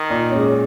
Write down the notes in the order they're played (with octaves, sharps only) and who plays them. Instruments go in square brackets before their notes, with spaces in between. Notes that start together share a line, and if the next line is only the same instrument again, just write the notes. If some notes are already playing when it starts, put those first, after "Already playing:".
Already playing: [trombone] D#3
[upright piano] A#2
G#3 C#4